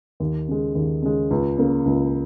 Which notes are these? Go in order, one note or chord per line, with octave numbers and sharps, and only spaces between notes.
D#2
C#3 G#3
D#2
C#3 G#3
C#2
C#3 A#3
C#2